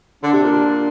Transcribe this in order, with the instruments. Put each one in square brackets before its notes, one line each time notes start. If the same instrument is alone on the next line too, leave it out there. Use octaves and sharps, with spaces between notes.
[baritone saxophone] D3 [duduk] D4
[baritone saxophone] C3
A#2